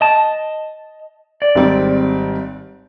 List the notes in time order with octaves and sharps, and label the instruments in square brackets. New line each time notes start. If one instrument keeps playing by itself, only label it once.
[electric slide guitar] D#5 A5
D5
[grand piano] G#1 G3 C4